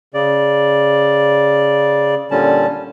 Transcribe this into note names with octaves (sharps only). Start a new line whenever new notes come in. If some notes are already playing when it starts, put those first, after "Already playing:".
C#3 D5
A#2 D3 G3 C#4 A5